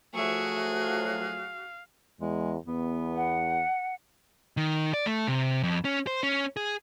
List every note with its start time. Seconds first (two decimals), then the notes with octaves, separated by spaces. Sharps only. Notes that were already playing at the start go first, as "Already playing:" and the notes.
0.15 F3 F#3 A3 F#4 G#4 E5 C#6
0.81 F5
2.21 E2 G#3
2.67 E2 B3
3.15 F#5
4.57 D#3
4.94 D5
5.06 A3
5.27 C3
5.63 F2
5.85 C#4
6.07 C5
6.23 C#4
6.57 G#4